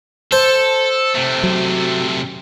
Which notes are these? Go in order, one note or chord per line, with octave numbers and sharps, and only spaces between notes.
A4 C5
C3 A3
F#3